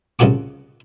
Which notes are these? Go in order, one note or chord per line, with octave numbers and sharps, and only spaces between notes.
C2 C#3 F3 F#4 D6